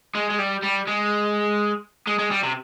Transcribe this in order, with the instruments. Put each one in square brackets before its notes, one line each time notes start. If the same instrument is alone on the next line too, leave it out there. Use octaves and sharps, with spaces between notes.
[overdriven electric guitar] G#3
G#3
G3
G3
G#3
G#3
G#3
G3
C3